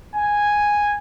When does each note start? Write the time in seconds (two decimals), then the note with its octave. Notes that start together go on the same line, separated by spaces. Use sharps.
0.15 G#5